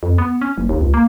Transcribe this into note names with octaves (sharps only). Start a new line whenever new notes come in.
F2
B3
C#4
F#1
D#2
C#2
A#3